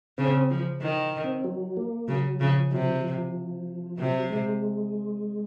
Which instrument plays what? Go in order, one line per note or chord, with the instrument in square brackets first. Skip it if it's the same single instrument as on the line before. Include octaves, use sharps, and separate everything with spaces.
[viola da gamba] C#3 [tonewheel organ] C4
[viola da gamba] F3
D#3
[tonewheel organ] C4
F#3
A#3
[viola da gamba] C#3 [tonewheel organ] F#3
[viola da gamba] C#3 [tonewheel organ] F3
[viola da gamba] C3 [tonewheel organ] F#3
[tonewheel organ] F3
F3
[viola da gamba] C3 [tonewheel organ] F#3
[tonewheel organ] G#3